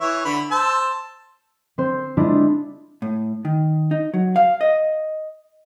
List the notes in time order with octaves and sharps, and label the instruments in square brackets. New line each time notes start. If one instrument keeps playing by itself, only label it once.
[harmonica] E3 E4 C#5
D3 B5
C5 A5 E6
[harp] C4 C5
G#3 D4 E4 F4
[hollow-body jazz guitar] A2
D#3
D#4
F#3
F5
D#5